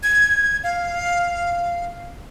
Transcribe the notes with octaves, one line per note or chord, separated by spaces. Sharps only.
G#6
F5